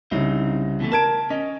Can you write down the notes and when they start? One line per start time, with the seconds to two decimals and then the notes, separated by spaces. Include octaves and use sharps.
0.11 C2 C#3 C4 D#4
0.80 B2 E3 A3
0.92 A#4 A5 G#6 D7
1.30 C#4 D#5